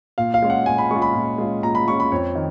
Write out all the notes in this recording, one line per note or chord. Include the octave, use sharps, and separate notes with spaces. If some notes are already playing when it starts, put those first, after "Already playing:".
A#2 F5
F5
G#3 C#4 F4
F#5
A#2 G#5
B5
G#3 C#4 F4 C#6
B5
A#2
G#3 C#4 F4
A#2 A#5
B5
G#3 C#4 F4 C#6
B5
F2 C#5
D#3